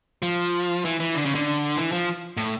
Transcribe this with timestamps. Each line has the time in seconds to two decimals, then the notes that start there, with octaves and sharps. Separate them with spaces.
0.22 F3
0.85 E3
1.00 E3
1.15 D3
1.25 C#3
1.35 D3
1.76 E3
1.92 F3
2.37 A2